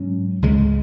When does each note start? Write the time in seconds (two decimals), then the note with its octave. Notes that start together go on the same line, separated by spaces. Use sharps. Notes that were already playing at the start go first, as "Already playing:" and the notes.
Already playing: G#2 F#3 C#4
0.42 C#2 C#3 G#3